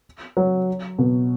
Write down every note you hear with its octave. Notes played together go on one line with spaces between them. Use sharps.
F#3
B2